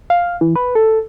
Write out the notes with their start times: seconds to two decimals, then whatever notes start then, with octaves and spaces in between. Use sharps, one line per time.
0.10 F5
0.41 E3
0.56 B4
0.75 A4